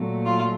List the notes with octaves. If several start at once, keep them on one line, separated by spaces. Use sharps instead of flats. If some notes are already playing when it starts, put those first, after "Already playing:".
Already playing: A#2 F#3 A3
F4